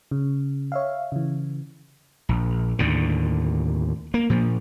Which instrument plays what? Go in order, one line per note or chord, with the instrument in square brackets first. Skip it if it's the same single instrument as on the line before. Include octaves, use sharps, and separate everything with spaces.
[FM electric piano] C#3
C#5 E5 F5
C#3 E3
[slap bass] A#1
D#2 A2 D3
A#3
A#2 F3